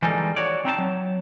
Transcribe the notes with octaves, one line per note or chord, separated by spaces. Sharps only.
E3 G3 G#3 A#3 D#4 A4
F#4 C#5 D5
C4 D#4 E4 A5
F#3